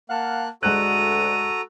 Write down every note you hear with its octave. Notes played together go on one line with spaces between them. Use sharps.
A#3 F5 F#5 A5 F#6
D2 G#3 F#4 A4 A#5 F#6 D#7